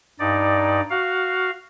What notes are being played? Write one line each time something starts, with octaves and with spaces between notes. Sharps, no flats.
G2 D#4 D5
F#4 F5